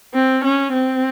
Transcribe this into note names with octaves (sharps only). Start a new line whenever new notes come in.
C4
C#4
C4